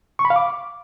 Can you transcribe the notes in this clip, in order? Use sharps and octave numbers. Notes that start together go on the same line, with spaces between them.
C#6
B5
F5
D6